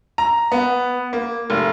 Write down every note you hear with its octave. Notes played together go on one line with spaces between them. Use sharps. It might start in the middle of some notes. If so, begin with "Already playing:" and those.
A#5
B3
A#3
F1